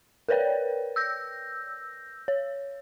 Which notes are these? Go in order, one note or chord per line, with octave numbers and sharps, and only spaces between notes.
A#4 B4 C#5 D5 G5
E6 G6 A#6
C#5